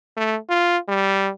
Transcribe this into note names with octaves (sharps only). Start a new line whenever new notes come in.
A3
F4
G3